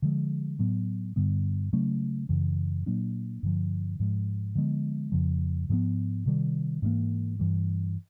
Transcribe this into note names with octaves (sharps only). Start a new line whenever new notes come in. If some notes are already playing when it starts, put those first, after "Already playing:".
D3 F3 G#3
A2 F#3 B3
G2 D3 G3 B3
C#3 F#3 A3 C#4
F#2 C#3 E3
A#2 F#3 A#3 D4
G2 D3 F3
G#2 F3 G#3
D3 F3 G#3 B3
F2 C#3 F3
G#2 F3 G#3 B3
C3 D#3 G3
G#2 E3 G3 A#3
G2 E3 G3